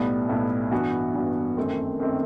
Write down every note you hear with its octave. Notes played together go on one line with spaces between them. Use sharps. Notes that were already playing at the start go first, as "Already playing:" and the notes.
Already playing: B1 A2 G3 B3 E4
B1 A2 G3 B3 E4
G2 E3 B3 F#4
G2 E3 B3 F#4
F#2 D#3 A3 C4
F#2 D#3 A3 C4